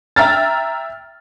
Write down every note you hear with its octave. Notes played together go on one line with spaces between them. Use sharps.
E5 G5 A#5 F6 A6